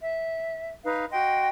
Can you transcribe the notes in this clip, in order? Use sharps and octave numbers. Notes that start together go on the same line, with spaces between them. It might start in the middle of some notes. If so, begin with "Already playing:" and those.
E5
D#4 B4 F5
F#4 D#5 G5 C6